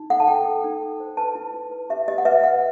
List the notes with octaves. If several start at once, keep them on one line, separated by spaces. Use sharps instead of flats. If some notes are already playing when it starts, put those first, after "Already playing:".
Already playing: D#4
A4 F#5
A5
A4 G5
A4
D#4
A4
C5
B4 A5
E4
E4
B4
G4 E5
G4 D#5
F#5
B4 E5
B4 F#5